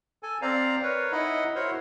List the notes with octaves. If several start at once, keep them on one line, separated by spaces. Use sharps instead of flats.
A4 G#5
C4 C5 D5 F5 A#5
A#4 B4 C#5
D#4 E4 D#5 F#5 B5
E4 F#4 A#4 C5 C#5